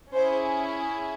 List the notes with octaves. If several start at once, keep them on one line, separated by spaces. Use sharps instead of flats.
C#4 E4 G#4 C5